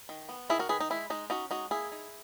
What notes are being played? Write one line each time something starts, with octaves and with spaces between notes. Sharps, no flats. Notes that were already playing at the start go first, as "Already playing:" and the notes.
D#3
B3
D#3 E4 G#4
F#4 A#4
D#3 G#4 B4
D#4
G#3 E4
G#3 D#4
C#4 D#4 F#4
G#3 D#4 F#4
A#3 E4 G#4
D#4